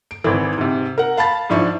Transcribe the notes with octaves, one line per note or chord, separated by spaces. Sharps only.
D7
G#1 E3
G#2 C3
A#4 F#5
F5 A5 B5 A6
G#2 F3 D4 E4 C#6